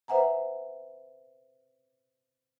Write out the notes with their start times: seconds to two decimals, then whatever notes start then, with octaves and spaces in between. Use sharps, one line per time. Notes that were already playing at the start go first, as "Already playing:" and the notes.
0.08 B4 C5 E5 F#5 G#5 A#5